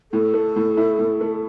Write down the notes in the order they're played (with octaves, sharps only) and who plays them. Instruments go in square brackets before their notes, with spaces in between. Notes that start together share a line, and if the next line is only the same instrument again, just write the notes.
[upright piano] A2 [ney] A4
[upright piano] A3
A2
E4
A2
A3